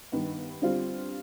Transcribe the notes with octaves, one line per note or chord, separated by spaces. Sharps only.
G2 D#3 B3
D3 G3 C4 F4